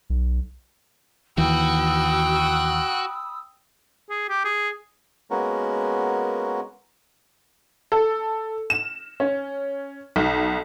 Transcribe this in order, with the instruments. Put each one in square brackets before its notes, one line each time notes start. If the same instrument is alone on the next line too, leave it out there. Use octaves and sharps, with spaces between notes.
[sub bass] B1
[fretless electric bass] D#2 E3 [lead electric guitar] F#4 [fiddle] G5 F#6 [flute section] B5 D#6 E6
[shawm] G#4
G4
G#4
[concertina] G#3 A#3 B3 C#4 F#4 A#4
[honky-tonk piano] A4
E7
C#4
B1